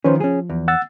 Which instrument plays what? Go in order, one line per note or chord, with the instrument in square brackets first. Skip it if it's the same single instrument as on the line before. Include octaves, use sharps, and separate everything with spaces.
[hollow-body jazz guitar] D#3 F3 B4 [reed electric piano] C#4 C5
[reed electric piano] F3 [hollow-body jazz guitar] C#4 G#4
[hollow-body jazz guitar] E2
[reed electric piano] F#5 E6 A6